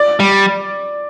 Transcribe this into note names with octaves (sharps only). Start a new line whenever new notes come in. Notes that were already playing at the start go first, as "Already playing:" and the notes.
Already playing: D5
G3